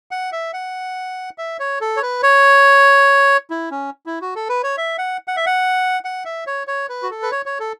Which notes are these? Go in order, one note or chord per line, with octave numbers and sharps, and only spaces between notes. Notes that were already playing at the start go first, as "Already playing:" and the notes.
F#5
E5
F#5
E5
C#5
A4
C#5
B4
C#5
E4
C#4
E4
F#4
A4
B4
C#5
E5
F#5
F#5
E5
F#5
F#5
E5
C#5
C#5
B4
F#4
A4
B4
C#5
C#5
A4